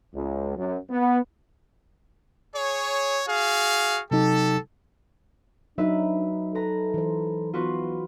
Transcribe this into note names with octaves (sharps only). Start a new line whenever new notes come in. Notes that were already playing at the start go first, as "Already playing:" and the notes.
C#2
F#2
B3
G#4 C#5
F#4 G#4 F5
C3 F#3 D#4 G4 A4
F#3 D4 D#4 B4 E5
A4 B4 A#5
E3 C5
B3 F4 F#4 B4